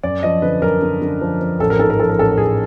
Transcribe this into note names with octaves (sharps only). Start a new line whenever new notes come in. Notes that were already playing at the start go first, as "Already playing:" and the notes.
F#2 D5
F3 D#5
D3 B4
F#2 A#4
D3
D3
F3
F3
A1 A4
A#4
G#2 A4
A#4
F3 A4
A#4
A1 A4
A1 G#4